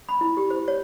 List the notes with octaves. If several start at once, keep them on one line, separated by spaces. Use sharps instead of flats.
B5
E4
G4
C5
C#5